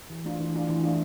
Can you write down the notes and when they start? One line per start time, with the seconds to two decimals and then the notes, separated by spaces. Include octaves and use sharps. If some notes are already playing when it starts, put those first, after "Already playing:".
0.10 E3
0.24 A3 D4 F4
0.40 E3
0.54 A3 D4 F4
0.69 E3
0.84 A3 D4 F4